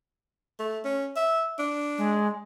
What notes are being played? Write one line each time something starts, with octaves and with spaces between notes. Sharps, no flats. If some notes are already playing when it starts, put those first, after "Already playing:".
A3
C#4
E5
D4
G#3